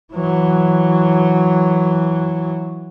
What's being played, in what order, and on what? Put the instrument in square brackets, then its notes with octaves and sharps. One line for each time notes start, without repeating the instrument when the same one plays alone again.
[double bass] E3 F#3